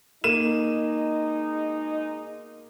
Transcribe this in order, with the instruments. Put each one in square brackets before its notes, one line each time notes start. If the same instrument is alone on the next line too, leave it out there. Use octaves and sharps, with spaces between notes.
[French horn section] B2 G#3 D#4 [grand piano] A#3 D#7 E7